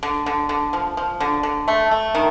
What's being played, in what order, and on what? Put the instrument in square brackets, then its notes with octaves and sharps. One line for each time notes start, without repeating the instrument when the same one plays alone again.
[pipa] D3
D3
D3
F3
F3
D3
D3
A3
A3
D#3